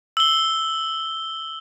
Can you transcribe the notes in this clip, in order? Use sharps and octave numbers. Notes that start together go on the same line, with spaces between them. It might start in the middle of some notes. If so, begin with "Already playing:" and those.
E6 G7